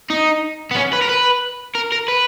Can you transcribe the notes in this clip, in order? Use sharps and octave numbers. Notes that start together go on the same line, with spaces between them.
D#4
B3
C#4
B4
A#4
B4
A#4
A#4
B4